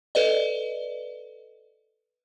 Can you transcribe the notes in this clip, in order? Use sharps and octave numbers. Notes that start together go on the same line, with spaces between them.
A4 B4 D5 D#5